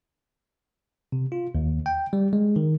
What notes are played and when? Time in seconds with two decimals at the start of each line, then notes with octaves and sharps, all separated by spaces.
1.12 C3
1.32 F4
1.55 D#2
1.86 G5
2.13 G3
2.33 G#3
2.56 D#3